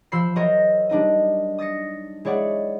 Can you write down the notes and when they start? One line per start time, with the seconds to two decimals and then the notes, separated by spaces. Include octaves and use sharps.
0.12 F3 C5 B5 E6 C7
0.36 F#3 F#4 A#4 C5 C#5 D#5
0.89 G3 D4 D#4 D#5
1.58 D#6 A6 A#6 C#7
2.25 G#3 E4 C#5 D5 F#5